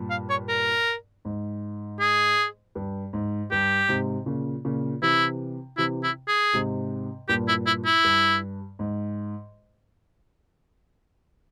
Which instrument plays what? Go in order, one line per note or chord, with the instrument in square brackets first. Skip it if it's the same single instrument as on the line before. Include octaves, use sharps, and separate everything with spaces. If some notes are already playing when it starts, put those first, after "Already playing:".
Already playing: [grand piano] G2 A#2
[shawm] F5
C#5
A#4
[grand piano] G#2
[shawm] G#4
[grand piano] G2
G#2
[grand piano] G2 [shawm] G4
[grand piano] G#2 C3
A#2 C#3
A#2 C#3
[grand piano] C3 E3 [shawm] E4
[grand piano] C3 E3 [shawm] E4
[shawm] E4
G#4
[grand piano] G#2 C3
[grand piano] G2 A#2 [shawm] G4
[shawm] E4
E4
E4
[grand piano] G2
G#2